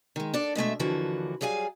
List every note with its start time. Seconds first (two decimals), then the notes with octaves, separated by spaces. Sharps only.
0.16 D#3 G#3
0.34 D4 A4 D5
0.55 B2 G#3 A3 E5
0.79 D#2 D3 E3 F3 F#4
1.41 F#3 G3 G#4 F5 G#5